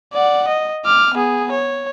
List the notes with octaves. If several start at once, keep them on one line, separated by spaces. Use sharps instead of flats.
D5 F#5
D#5
D6 F6
B3 G#4
C#5